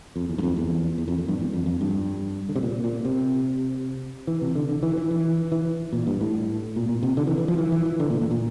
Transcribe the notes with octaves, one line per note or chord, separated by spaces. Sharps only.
F2
E2
G2
F2
E2
E2
F2
F2
G2
E2
F2
F2
G2
D3
C3
A#2
A#2
C3
E3
C3
D3
D3
E3
E3
E3
E3
A#2
G2
A2
A#2
A#2
C3
D3
E3
E3
F3
E3
E3
E3
D3
A#2
A2
A#2